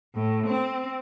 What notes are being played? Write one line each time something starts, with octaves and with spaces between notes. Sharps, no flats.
A2
C4